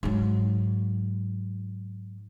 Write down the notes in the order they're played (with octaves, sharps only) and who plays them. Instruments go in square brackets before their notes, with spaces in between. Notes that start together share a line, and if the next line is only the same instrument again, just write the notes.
[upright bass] G#2 F#3